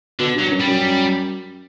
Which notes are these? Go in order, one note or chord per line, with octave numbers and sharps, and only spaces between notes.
B2 D3
G2 F#3
F#2
G3
F#2